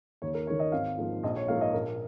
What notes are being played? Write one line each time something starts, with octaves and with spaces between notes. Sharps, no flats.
D#2 C#5
A#4
D#3 A#3 C#4 C#5
D#5
G#1 F5
G#2 F3 A#3
A#1 D#5
C#5
G#2 F3 A#3 F4 F5
D#5
A#1 A#4